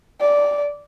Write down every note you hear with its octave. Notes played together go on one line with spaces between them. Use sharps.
D5